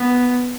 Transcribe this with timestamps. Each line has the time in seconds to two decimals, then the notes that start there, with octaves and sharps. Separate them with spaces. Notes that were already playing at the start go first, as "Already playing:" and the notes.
Already playing: B3